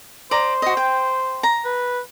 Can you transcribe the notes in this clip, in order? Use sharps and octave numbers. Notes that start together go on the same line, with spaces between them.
C5 D5 A#5
F#4 D#5
G5
A#5
B4